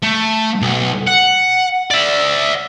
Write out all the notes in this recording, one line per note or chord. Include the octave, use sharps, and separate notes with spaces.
A3
B1
F#5
D5 E5